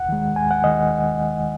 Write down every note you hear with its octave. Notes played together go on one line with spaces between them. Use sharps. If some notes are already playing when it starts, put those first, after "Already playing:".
Already playing: D#2 F#5
D#3 G#3
D#2 G#5
F#5
D#3 G#3 D#5